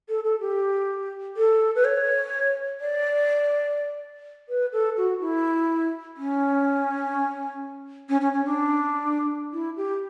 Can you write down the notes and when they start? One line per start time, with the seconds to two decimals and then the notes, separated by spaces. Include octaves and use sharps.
0.09 A4
0.24 A4
0.40 G4
1.36 A4
1.75 B4
1.84 C#5
2.80 D5
4.49 B4
4.72 A4
4.97 F#4
5.20 E4
6.16 C#4
8.09 C#4
8.21 C#4
8.32 C#4
8.45 D4
9.53 E4
9.77 G4